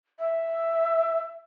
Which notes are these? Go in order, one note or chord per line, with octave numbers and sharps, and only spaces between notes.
E5